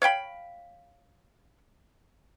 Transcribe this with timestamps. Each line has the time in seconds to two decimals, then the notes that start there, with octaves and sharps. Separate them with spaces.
0.02 C#5 F5 G5 B5